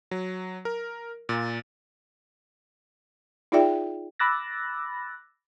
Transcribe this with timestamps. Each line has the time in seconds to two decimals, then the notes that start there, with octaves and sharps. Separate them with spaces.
0.11 F#3
0.65 A#4
1.29 A#2
3.52 D#4 F4 G#4 D5 E5 G5
4.19 B5 D6 E6 F#6 A6 A#6